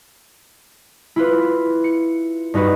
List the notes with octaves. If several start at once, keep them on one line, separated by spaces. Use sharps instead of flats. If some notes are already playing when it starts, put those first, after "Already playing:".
E4 F4 B4
C#7
G2 D#4 F#4 B4